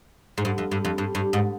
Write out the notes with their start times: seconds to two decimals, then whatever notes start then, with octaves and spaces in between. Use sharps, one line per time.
0.38 G#2
0.45 G2
0.58 F2
0.72 G2
0.85 F2
0.98 G2
1.15 G2
1.33 G#2